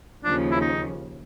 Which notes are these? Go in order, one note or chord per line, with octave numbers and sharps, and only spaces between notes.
D#2 C#3 F3 D4
E4
D#4